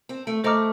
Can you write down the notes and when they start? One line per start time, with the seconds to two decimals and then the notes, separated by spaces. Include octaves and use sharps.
0.09 C4
0.27 A3
0.44 A3 C5 D#5 A#5 D6 F6